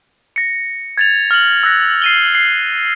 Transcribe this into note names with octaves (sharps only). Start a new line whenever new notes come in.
A#6 C#7
G#6 A6 F7
F6 F#7
E6 F#6 A#6
C7 D#7 G7
C7